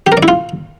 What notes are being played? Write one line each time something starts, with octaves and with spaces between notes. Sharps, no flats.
G4
A#4
D5
E4
F4